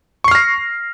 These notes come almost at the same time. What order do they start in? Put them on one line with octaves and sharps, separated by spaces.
C#6 C7 F6 A#6